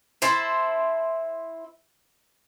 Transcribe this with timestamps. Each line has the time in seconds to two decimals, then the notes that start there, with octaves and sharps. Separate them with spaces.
0.22 E4 C5 A5